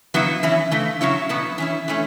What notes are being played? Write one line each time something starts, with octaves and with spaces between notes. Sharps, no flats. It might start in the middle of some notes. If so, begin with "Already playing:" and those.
C#3 F#3 B3 E4
E3 C#4 E4
C#3 E3 A3
C#3 F#3 C#4 E4
B2 F#3 B3 E4
E3 C#4 E4
E3 A3 C#4